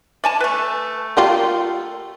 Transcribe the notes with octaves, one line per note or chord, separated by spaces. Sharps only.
D5 G#5 A5
A3 B4
F4 G4 A#4